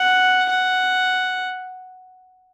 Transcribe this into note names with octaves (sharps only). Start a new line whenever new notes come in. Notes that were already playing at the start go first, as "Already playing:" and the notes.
Already playing: F#5
F#5